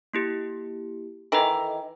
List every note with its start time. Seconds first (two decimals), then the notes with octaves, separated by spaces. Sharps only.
0.13 A#3 E4 G4
1.32 D#3 E3 A4 D#5